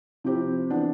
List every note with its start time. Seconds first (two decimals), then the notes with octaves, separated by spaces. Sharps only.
0.24 C3 F3 C4 E4 G4
0.70 E3 B3 D4